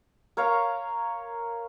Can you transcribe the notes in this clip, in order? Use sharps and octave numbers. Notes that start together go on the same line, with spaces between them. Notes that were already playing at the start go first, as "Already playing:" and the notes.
A#4 C#5 F5 A#5